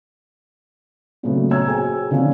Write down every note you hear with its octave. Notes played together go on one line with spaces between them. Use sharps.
A#2 C#3 F#3 A3 B3
C#5 A#5 E6 G#6
F#4 G#4 C5 G5 G#5
D3 D#3 F3 A#3 C#4 D4